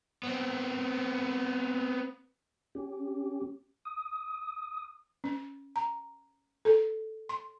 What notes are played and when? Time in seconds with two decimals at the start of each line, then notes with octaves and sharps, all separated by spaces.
0.23 B3 C4
2.75 C#4 G4
3.85 D#6
5.24 C#4
5.76 A#5
6.65 A4
7.29 C6